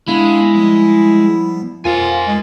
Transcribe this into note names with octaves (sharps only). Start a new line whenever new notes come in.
G#3 B3 D4 E4 F5
F3 G3 B3
F2 F4 A#4 C5 G#5 A6
G#3